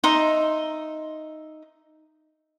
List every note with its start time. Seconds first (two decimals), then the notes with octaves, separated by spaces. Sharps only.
0.04 D#4 D#5 E5 C6